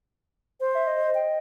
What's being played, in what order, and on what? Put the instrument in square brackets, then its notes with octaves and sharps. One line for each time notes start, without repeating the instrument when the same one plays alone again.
[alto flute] C5
[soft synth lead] E5
D#5
[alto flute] G5